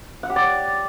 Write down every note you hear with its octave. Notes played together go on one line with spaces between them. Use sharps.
F#5
G4
D5